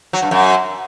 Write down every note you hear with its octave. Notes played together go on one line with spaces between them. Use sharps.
F#3
G2
F#2